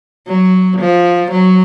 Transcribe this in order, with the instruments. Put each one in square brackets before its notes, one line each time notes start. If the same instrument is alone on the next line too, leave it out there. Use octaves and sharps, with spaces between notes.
[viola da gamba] F#3
F3
F#3